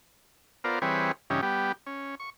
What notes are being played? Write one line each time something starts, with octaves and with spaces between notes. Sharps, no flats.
B3 F4 A#4 C5 D5
E3 G3 C4 G#4 B4 C#5
G2 C#3 E3 C#4 D#4 G4
G3 B3 G4
C#4
C#6